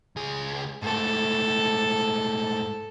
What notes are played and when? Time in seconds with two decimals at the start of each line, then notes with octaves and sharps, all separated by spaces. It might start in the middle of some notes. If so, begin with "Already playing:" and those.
0.16 C#2 G#4
0.83 G#2 A3 A4